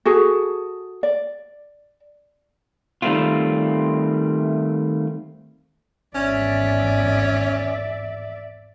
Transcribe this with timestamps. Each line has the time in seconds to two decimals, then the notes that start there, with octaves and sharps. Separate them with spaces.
0.05 F#4 G#4 A4
1.03 D5
3.02 D#3 G3 A3 C4 E4 F4
6.15 G#1 E2 C#4 D5 E5